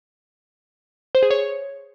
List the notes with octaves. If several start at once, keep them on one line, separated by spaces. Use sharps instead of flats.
C5
G#4
C#5